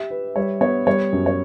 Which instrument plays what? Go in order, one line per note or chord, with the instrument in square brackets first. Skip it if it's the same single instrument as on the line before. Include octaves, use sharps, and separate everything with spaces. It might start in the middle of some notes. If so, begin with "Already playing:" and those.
Already playing: [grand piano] G4 [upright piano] E5
[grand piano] B4
[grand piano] G3 [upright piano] C#5
[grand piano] B3 [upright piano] C#5
[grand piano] G3 [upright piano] C#5
[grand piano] F#2
[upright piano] C#5